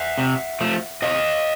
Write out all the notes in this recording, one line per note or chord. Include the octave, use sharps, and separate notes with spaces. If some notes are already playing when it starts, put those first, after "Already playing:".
Already playing: E5 F#5
C3
F3 A3
C3 D#5 F5